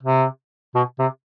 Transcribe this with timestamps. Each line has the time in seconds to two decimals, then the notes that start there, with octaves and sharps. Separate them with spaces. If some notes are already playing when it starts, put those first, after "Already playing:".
0.03 C3
0.75 B2
0.99 C3